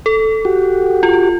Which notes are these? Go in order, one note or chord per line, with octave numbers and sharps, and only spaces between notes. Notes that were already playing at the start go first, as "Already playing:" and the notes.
A4
F#4 G4
F4